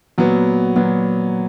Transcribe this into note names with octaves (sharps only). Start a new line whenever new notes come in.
A#2 F#3 B3
A#2 F#3 B3